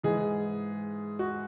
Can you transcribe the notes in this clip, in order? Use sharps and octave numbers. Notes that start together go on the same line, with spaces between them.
G#2 E3 G#4
F#4